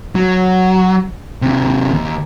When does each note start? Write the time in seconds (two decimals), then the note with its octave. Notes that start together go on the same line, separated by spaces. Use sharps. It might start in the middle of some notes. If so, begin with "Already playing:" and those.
0.15 F#3
1.42 D#2 C3
1.93 D#2